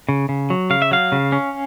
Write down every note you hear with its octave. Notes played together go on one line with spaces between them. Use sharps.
C#3
C#3
F#3
C#3 F5
E5
F#3 F5
C#3
C#4